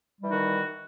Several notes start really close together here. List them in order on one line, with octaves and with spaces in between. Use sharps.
G3 E3 D#4 F#4 D#3